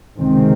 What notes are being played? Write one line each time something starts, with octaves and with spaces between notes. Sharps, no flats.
C#2 C3 D#3 G#3 C4